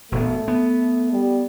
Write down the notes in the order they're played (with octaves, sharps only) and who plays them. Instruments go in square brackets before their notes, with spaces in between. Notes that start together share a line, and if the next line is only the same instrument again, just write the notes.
[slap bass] E1 A#2 B3 [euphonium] A3
[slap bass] B3
[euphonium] G3